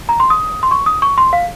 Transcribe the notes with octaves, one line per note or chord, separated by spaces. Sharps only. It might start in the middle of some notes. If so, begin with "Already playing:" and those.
A#5
C6
D#6
C6
C#6
D#6
C#6
C6
F5